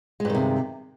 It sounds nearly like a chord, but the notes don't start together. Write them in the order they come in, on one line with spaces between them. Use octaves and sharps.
G#3 G2 D#3 C3